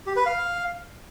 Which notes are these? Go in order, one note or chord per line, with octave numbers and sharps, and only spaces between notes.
G4
B4
F5